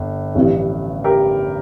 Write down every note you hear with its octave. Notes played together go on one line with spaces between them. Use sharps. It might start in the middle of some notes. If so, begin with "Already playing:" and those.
Already playing: G1
A1 G2 F3
G4 A#4